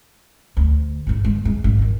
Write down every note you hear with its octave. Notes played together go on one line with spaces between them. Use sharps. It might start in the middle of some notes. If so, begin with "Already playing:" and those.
D2
G#1 E2
G#3
G#3
G#1
D#3 F3